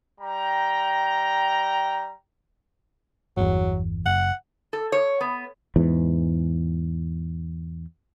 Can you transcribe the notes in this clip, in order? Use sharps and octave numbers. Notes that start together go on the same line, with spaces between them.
G3 G5 A#5
G1 E2 F#3
F#1 F#5
A4
C#5
B3
E2 G#2 E3